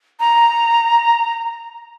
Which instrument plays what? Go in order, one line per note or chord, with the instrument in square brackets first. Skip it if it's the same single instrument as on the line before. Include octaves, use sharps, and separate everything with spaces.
[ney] A#5